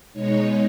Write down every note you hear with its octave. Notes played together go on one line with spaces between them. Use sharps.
B2 G#3 D#4 C#5